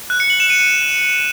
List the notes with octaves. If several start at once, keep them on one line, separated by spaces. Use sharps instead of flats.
F#6
C#7
F#7
E7
D#7